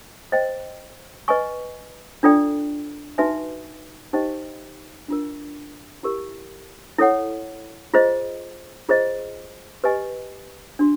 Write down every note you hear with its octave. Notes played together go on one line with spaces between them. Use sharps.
C5 D#5 G5
B4 D#5 G#5 C#6
D4 F4 A4 D5 G5
D#4 F#4 B4 E5 G#5
D#4 G4 C5 D#5 G5
D4 F4 A#4
E4 G4 A#4
E4 A4 C#5 F#5
F4 G#4 C5 D#5
F4 G#4 C5 D#5
G4 B4 D#5 G#5
D4 F#4